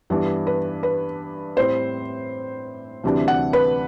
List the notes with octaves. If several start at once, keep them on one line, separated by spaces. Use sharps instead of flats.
G2 E3 G3 B3 D4
B4
B4
A2 G3 C4 E4 C5
D2 C3 E3 G3 D4
F#5
B4